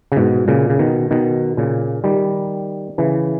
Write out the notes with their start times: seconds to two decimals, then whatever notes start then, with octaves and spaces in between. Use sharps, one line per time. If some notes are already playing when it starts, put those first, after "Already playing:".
0.12 C#3
0.16 G#2 B2
0.48 A#2 C#3
0.70 C#3
0.79 B2 D#3
1.11 B2 D#3
1.57 A#2 C#3
2.04 D#3 G3
2.98 C#3 E3